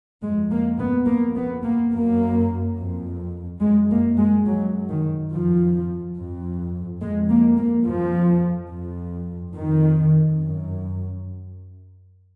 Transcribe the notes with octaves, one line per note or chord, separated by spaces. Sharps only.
F2 G#3
A#3
B3
F2 A#3
B3
A#3
F#2 A#3
F2
F#2 G#3
A#3
G#3
F#2 F#3
D#3
F2 F3
F2
F2 G#3
A#3
A#3
F2 F3
F2
F2 D#3
F#2